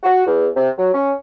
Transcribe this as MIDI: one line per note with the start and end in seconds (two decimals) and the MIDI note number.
0.03 0.23 66
0.27 0.48 40
0.56 0.69 48
0.78 0.90 54
0.93 1.12 61